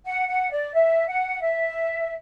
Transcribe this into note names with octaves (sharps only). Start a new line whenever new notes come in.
F#5
F#5
D5
E5
F#5
E5